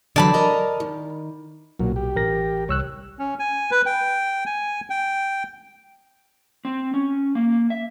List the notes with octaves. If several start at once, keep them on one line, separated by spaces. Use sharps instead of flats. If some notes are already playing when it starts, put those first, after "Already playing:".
D3 E3 F#3 D5 A5 B5
A#4 D#5 A#5
D#3
B1 A#2 F#3
G4
A1 A#4 A#6
C2 C#5 E6 F#6
C#4
G#5
B4
G5
G#5
G5
C4
C#4
A#3
E5